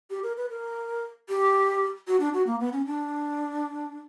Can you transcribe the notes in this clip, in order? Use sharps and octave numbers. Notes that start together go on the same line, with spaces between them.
G4
A#4
B4
A#4
G4
F#4
D4
F#4
A#3
B3
C#4
D4